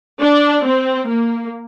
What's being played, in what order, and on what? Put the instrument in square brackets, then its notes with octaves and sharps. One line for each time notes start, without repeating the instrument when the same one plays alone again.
[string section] D4
C4
A#3